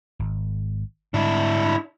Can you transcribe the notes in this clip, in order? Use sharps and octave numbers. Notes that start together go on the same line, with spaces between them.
G#1
G#2 D3 G3 D4 E4